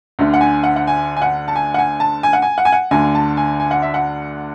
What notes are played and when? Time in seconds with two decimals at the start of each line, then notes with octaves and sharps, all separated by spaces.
0.19 D2 D3
0.34 F#5
0.41 G#5
0.64 F#5
0.76 F#5
0.87 G#5
1.17 G#5
1.22 F#5
1.48 A5
1.56 G#5
1.74 F#5
1.78 G#5
2.00 A5
2.23 G#5
2.33 F#5
2.42 G#5
2.58 F#5
2.65 G#5
2.72 F#5
2.91 D2 D3 G#5
3.15 A5
3.37 G#5
3.60 G#5
3.71 F#5
3.82 E5
3.94 F#5